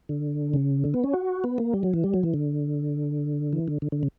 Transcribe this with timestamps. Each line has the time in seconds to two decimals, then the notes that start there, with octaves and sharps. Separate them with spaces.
0.09 D3
0.54 C#3
0.84 D3
0.94 B3
1.04 C#4
1.13 F#4
1.44 B3
1.58 A#3
1.74 G3
1.83 F#3
1.94 E3
2.04 G3
2.14 F#3
2.23 E3
2.34 D3
3.53 E3
3.68 D3
3.82 D3
3.92 D3
4.03 C#3